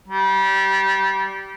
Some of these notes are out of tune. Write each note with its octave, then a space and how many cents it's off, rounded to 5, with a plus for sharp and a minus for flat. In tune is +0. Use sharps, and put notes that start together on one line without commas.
G3 -20